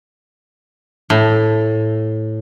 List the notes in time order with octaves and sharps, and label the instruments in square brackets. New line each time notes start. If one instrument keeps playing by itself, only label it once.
[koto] A2